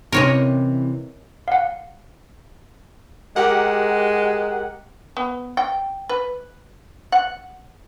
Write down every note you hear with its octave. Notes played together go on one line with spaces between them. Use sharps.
C3 E3 C#4 A#4 C#5 D#5
F5 F#5
G#3 G4 A#4 F#5
B3
G5
B4
F#5